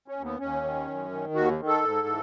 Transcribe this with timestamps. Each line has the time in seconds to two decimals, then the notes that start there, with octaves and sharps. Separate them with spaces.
0.08 C#4
0.16 D#2
0.24 B3
0.39 D#2 C#4
0.64 D#3
0.88 F#2
1.11 D#3
1.35 D#2 F#4
1.60 D#3
1.67 A4
1.83 G#2
2.07 E3